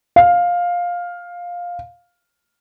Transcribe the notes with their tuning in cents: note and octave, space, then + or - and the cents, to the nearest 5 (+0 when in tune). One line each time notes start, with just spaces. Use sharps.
F5 +10